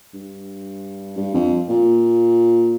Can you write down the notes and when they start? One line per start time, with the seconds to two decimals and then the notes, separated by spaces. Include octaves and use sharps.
0.14 G2
1.17 G2
1.34 F2
1.69 A#2